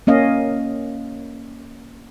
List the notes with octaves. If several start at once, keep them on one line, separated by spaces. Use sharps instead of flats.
A#3 C#4 D#5 F5